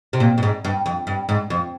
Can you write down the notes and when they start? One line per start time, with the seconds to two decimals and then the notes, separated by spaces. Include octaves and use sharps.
0.13 C3
0.20 A#2
0.38 G2
0.43 G#2
0.64 G2
0.86 F2
1.07 G2
1.29 G#2
1.50 F2